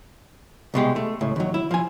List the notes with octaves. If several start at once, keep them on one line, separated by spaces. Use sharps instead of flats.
C2 B2 G#3 G4
A3
C#2 A2
D#2 F#3
E4
F3 G#5